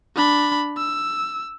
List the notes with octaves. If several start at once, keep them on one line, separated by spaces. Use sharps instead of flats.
D4 B5
E6